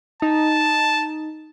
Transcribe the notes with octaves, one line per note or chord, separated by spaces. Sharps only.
D#4 A5